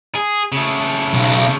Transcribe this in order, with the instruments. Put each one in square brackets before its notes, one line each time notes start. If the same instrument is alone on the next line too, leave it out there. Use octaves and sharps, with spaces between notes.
[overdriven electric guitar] G#4
C#3 A3
[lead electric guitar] B1